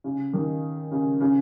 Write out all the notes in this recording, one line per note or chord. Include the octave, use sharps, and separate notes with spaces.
C#3
D#3
C#3
C#3